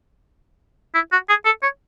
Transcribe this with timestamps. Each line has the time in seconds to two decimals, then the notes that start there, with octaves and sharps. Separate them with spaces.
0.94 E4
1.12 F#4
1.29 G#4
1.45 A4
1.63 C#5